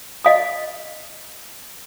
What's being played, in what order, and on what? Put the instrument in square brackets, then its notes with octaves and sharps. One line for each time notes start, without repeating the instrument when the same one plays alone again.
[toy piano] D#5 F5 D#6